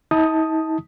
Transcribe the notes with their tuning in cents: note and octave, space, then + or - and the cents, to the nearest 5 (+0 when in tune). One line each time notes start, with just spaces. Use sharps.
D#4 +45 A5 +0 D#6 +0